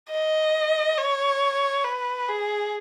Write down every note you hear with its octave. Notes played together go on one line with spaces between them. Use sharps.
D#5
C#5
B4
G#4